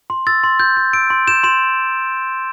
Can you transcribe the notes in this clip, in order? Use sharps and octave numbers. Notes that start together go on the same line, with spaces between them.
C6
E6 A6
C6
G6
C6
E6 D7
C6
G6 E7
C6 E7